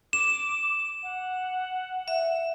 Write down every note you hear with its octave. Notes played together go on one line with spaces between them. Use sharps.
D6 E7
F#5
E5